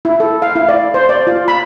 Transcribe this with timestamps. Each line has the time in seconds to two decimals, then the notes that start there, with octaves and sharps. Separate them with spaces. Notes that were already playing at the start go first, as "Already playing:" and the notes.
0.05 E4
0.20 A4
0.42 F5
0.56 E4
0.69 D5
0.94 C5
1.09 D5
1.27 F4
1.48 B5